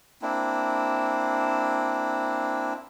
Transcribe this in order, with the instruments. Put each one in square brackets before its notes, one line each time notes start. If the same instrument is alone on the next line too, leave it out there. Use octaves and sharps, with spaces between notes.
[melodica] A#3 C4 D4 E4